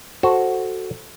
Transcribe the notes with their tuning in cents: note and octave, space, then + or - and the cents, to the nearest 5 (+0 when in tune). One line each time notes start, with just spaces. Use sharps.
F#4 +0 A4 +0 C5 +10